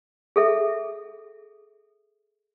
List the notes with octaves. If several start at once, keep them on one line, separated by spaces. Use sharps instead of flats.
G#4 A4 E5